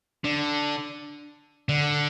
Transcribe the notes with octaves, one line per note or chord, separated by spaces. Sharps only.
D3
D3